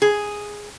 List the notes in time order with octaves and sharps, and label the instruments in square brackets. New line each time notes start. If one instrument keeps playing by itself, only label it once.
[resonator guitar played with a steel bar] G#4